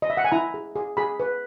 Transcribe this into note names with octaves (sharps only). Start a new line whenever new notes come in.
D#5
E5
F#5
G#5
E4 A#5
G#4
G#4
G#4 B5
B4